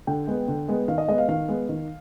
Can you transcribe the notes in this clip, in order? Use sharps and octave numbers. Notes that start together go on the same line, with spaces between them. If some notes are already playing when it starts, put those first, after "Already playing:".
D3 G5
G#3 B3
D3
G#3 B3
D#3 F5
D#5
G#3 B3 D#5
F5
D#3 F5
G#3 B3
D#3